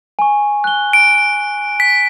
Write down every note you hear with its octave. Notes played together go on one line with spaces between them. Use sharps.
G#5 C#6
F#6 G7
D7
B6